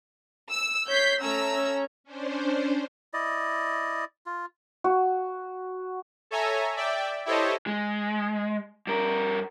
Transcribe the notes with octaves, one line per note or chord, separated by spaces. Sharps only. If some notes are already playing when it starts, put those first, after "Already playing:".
E6
C#5 G6 B6 C7
A3 C#4 A#5 E6
C#4
C#4 D4 C5
E4 D5 D#5
F4
F#4
A4 C#5 E5 G#5 A#5
D5 E5 G5
E4 G4 A4 C5 C#5 D#5
G#3
G2 A#4